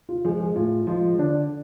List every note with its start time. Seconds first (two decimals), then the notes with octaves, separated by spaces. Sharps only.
0.09 F4
0.25 F3 G#3 G#4
0.40 G#4
0.56 A2 F4
0.87 F3 G#3 F4
1.18 D3 D4